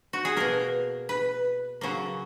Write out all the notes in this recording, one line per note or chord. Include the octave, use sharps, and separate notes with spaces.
F#4
G#4
B2 A#3 A#4
B4
C#3 F#3 A#3